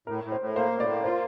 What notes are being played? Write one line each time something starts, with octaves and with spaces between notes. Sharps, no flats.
A2 A#4
A2
C5
A2
A#3 C5
A2
D5
A#3
F4 C5